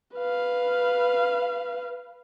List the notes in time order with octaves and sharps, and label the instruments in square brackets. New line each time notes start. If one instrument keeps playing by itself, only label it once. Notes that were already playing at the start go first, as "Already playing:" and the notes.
[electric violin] B4 F5